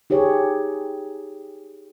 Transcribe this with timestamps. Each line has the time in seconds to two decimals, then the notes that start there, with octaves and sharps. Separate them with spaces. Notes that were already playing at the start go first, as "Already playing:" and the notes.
0.10 D#4 G4 G#4 C#5